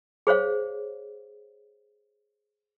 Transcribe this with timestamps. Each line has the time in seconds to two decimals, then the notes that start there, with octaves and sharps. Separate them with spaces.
0.27 G#4 C5 C#5 F5